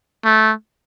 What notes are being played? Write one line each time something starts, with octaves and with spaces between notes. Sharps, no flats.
A3